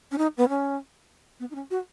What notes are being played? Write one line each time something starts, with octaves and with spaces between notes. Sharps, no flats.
C#4
D#4
B3
C#4
B3
D#4
C#4
F#4